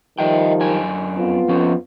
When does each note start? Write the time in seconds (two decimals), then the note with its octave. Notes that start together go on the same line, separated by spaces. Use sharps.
0.18 D#3 F3 G3 D#5 E5 G5
0.61 F#2 D4 G#5
1.16 F2 B3 F4
1.48 F3 C#4